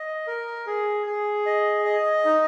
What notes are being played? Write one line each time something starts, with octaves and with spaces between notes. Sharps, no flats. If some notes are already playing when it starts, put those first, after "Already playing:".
Already playing: D#5
A#4
G#4
G#4
D#5
D#5
D#4